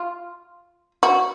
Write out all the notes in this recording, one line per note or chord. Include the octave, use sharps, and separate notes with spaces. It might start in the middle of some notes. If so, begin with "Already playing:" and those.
Already playing: F4
F#4